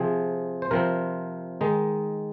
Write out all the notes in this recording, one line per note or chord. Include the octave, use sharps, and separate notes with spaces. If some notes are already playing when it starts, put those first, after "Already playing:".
Already playing: C3 F3 C4 G#4
C5
C3 F3 C4 A#4
D#3 G#3 D#4